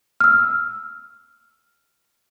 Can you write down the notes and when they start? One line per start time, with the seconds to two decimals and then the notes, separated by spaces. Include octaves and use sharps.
0.21 E6 F6